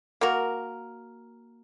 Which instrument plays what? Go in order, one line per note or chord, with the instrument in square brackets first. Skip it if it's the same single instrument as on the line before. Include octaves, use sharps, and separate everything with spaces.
[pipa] A#3 F#4 A#4